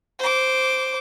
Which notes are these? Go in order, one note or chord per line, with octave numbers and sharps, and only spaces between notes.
C5 D6